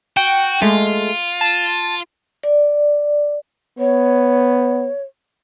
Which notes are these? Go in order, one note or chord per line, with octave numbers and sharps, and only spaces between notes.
F#4 G5
G#3 A3 F4
A5
D5
B3 C#5